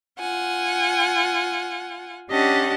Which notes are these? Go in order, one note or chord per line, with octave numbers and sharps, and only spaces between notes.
F4 F#5 G#5
C#4 D4 G4 D#5 F#5 A5